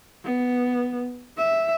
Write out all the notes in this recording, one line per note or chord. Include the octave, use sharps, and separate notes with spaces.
B3
E5